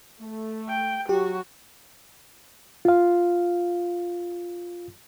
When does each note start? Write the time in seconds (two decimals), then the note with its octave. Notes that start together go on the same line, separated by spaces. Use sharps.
0.20 A3
0.68 G5
1.09 F#3 F#4 G4
2.85 F4 F5